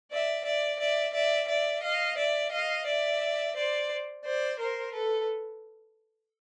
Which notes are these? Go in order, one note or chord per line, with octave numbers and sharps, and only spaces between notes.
D5 E5
D5 E5
D5 E5
D5 E5
D5 E5
D#5 F5
D5 E5
D#5 F5
D5 E5
C5 D5
C5 D5
A#4 C5
A4 B4